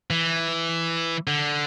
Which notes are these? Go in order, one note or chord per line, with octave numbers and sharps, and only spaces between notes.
E3
D3